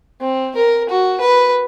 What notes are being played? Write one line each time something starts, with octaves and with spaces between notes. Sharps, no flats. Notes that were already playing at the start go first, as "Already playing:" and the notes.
C4
A#4
F#4
B4